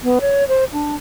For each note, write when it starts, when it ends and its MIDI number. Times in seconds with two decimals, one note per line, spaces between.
0.03 0.19 59
0.21 0.47 73
0.48 0.65 72
0.73 0.95 62